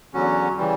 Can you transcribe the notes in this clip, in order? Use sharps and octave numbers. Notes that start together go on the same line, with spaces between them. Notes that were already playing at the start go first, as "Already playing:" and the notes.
E2 D3 F#3 C#4 F#4
C#3 E3 G3